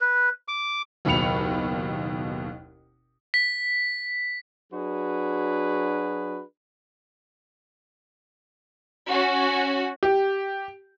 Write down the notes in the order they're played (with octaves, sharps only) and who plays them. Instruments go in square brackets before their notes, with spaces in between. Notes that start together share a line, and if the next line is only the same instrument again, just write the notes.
[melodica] B4
D6
[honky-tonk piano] F#1 D#2 B2 B5 C#7 F7
[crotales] B6
[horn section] F#3 D4 F#4 G#4 B4
[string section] C#4 F#4
[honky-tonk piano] G4